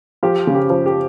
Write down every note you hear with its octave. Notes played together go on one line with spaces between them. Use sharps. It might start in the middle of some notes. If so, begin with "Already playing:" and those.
F3 G4
C#3
G4
F3
G4